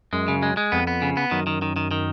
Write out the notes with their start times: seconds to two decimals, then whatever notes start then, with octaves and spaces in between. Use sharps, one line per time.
0.13 F#2 G#3
0.28 C#3
0.43 G#3
0.57 G#3
0.72 F2 B3
0.87 B3
1.02 C#3
1.17 B3
1.31 F#2 D#3
1.47 D#3
1.62 D#3
1.76 D#3
1.91 D#3